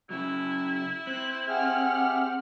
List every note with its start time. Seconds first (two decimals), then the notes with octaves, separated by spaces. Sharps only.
0.10 C#3 F#3 E4
1.07 C4 F#6
1.48 G4 G#4 E5 F#5 F6